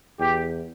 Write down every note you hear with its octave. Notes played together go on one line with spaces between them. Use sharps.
E2 G4